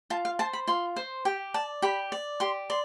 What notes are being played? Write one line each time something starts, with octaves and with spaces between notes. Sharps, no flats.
F4 A5
F5
C5 A5
B5
F4 C6
C5
G4 G5
D5 A5
G4 B5
D5
G4 C6
D5 C6